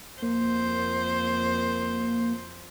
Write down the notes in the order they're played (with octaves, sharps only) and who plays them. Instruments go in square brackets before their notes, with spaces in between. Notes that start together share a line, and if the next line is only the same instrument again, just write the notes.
[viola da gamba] F2 C5 [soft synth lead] A#3